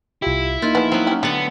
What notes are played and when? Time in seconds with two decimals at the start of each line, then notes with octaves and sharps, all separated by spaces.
0.22 C2 E4 F4 G4
0.62 A#3 D#4 F4
0.75 F3 B3 G#4
0.92 F#3 B3 C4
1.07 C#4 G4
1.23 D3 A3 B3 G4 F#5